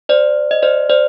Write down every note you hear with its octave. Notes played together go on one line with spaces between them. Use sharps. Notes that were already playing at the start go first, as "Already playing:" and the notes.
C5 D5
D#5
C5 D5
C5 D5